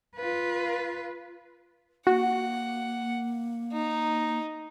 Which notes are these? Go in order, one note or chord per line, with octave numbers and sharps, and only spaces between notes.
F4 B4
A#3 F#4 F#5
D#4